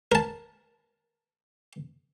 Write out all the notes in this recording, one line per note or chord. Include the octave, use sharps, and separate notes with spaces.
A#4 A5